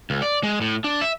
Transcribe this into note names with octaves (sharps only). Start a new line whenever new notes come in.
C#2
D5
G#3
A2
D4
E5